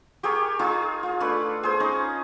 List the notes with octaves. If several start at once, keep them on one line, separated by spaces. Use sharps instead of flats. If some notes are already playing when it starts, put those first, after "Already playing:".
G4 G#4 A#4 C#5
D#4 F4 G#4
F4
A3 D4 B4
G#4 C5
C#4 D#4